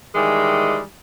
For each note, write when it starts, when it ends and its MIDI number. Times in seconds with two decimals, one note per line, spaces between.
0.15 0.81 51
0.15 0.81 52
0.15 0.81 55
0.15 0.81 56